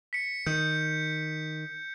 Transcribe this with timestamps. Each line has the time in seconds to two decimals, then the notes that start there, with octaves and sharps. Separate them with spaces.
0.13 B6 C#7
0.46 D#3 G6